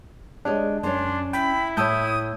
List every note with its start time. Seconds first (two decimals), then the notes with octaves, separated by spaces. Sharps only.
0.45 G#3 D4 G4 C#5 D#5
0.83 F#2 C#4 D4 C#5 C6
1.33 E4 G5 B5
1.77 A2 C#5 A5 D#6 E6 G6